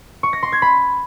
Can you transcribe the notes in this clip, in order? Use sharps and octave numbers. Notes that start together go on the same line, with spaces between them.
C#6
A#6
C6
G#6
B5